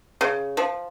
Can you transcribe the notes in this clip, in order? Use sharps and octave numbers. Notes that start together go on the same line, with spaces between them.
C#3
F3